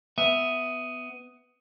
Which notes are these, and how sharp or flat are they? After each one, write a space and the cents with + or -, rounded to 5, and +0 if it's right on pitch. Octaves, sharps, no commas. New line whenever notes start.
B3 +15 E5 +0